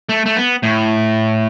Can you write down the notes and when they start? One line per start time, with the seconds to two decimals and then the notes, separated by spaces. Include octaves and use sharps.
0.09 A3
0.26 A3
0.36 B3
0.63 A2